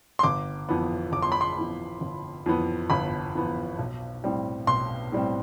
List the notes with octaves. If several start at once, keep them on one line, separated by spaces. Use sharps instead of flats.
C6
G1 D6
F2 E3 B3
G1 D6
C6
B5
C6
F2 E3 B3
G1
F2 E3 B3
G1 B5
F2 E3 B3
B1
A2 G3 C4
B1 C6
A2 G3 C4